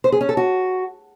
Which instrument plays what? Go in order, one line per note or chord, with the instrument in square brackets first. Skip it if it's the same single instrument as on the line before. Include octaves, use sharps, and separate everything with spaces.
[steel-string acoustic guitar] C5
G#4
C#4
A4
F#4